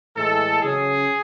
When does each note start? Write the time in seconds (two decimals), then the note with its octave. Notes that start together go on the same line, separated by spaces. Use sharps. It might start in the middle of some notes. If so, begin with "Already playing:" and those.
0.15 A2 E3 G#3 A4
0.61 C#3 F#3 C#4 G#4